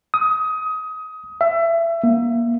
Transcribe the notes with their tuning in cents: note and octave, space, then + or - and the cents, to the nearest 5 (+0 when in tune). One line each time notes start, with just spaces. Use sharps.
D#6 +20
E5 +25
A#3 +20